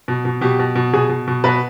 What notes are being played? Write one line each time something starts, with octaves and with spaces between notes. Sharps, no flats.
B2
B2
B2 G4
B2
B2
B2 G#4
B2
B2
B2 B4